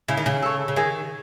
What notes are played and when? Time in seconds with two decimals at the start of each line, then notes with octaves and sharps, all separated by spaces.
0.08 C#3 E4
0.17 D#3
0.26 C#3
0.42 A4 C#5
0.68 C#3
0.76 D#3 G#4